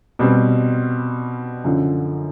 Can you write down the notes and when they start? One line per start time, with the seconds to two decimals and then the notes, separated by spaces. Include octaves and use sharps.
0.19 B2 G3 C4
1.64 F#2 D3 F3